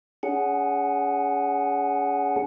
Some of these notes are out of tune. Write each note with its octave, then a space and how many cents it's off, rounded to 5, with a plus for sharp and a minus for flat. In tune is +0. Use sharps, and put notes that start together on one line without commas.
C#4 +35 G#4 +0 F#5 +0